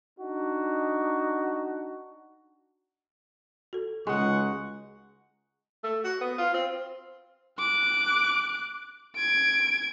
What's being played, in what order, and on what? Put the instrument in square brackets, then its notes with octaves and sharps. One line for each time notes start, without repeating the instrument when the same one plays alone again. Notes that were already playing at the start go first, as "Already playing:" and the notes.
[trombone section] D4 D#4 F#4
[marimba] F#4 A4
[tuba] C#2 [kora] G#3 [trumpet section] D#4 F#5 C#6
[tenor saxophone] A3
F#4
B3
F4
C4
[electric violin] D6 F#6
G#6 D7